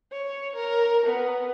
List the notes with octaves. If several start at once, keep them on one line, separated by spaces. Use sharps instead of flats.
C#5
A#4
B3